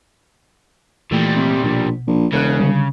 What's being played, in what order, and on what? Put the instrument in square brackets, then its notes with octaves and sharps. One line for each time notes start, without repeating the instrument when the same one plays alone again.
[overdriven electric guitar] A#2 G3 [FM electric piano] E3 A3 E4
[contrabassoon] C3
[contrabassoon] A#1 [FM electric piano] B2
[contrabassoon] A#1
[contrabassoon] E1 [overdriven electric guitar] C#3 [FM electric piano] F6 F#6
[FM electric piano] D3 G3